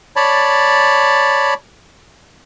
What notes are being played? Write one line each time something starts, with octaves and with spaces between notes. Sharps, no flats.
C#5 D5 A5 B5